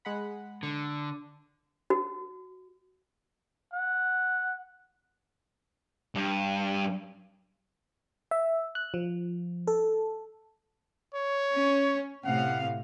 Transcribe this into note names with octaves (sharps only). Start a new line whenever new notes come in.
G#3 F#5 B5
D3
F#4
F#5
G2
E5
F#6
F3
A4
C#5
C#4
A2 C3 F5 F#5